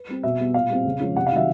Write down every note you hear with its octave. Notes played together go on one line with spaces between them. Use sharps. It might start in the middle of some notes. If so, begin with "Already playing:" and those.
Already playing: B4
G3 C4
B2 E5
G3 B3
A#2 F5
G3 C4
C#3
F3 G#3 C#4
C3 F#5
F5
D#3 F#3 E5